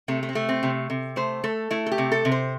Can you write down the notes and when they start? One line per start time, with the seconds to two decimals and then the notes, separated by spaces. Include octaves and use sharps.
0.08 C3 A3
0.23 A3
0.29 C4
0.35 A3
0.49 C4
0.63 C3
0.90 C3
1.16 A3 C5
1.44 A3 A4
1.71 A3 E4
1.86 A4
1.92 G4
1.98 C3
2.12 A4
2.25 C3
2.32 C5